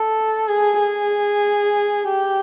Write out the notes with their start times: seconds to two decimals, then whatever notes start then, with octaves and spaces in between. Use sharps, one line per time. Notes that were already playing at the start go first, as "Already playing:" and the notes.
Already playing: A4
0.48 G#4
0.79 G#4
2.07 G4